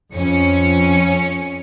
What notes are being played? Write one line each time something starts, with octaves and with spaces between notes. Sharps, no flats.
F2 C#4 C#7